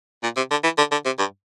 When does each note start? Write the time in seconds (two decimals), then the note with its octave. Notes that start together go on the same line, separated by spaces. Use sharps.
0.23 A#2
0.37 C3
0.51 D3
0.64 E3
0.78 D3
0.92 D3
1.05 C3
1.19 G2